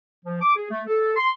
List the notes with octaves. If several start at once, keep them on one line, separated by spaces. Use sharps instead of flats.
F3
D6
G#4
A3
A4
C6